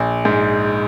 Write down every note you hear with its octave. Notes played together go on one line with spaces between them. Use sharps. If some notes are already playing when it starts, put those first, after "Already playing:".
Already playing: A#1
G#2